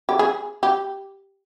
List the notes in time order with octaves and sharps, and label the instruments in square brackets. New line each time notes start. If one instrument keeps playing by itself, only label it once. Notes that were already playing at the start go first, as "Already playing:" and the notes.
[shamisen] G4
G#4
G4